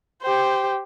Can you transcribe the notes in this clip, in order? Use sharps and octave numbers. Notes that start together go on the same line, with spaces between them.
G4 C5